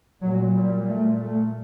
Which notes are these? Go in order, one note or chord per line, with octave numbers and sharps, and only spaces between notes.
A#2 F#3
G3
A3
A3